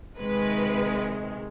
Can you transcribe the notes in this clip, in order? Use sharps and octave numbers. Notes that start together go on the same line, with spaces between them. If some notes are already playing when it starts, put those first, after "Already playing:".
C3 D#3 G#3 B4